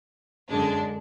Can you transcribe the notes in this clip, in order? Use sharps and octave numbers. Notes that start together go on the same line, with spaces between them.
F#2 D3 G#3 D4